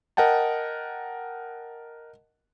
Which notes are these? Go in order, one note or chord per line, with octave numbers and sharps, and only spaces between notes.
A#4 D#5 F#5 G5 A5